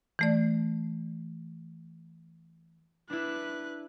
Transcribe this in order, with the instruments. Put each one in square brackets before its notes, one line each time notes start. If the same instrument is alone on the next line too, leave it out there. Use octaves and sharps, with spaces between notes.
[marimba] E3 A3 D5
[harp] D4 E4 [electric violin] B4 F#6